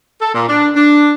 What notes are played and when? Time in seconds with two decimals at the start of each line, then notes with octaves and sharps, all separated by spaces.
0.21 A4
0.34 A#2
0.49 D4
0.76 D4